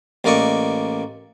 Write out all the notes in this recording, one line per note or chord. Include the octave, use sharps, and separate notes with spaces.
A1 A#3 D5 D#5 C#6